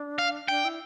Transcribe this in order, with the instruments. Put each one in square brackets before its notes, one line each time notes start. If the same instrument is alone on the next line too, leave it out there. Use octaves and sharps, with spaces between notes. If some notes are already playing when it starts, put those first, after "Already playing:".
Already playing: [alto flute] D4
[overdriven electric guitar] F5
[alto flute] D4 [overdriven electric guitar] G5
[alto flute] E4